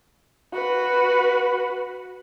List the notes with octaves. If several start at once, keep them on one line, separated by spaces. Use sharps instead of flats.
F#4 B4